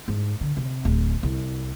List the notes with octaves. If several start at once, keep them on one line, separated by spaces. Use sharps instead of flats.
G#2
D3
C3
D1
C2